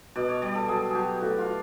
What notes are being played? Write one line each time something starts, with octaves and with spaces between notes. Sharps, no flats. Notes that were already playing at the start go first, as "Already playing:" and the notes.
B2 D5
C#5
G3 D5
A4
F#3 G#4
F#3 G4 G#4
A2 F#4
F4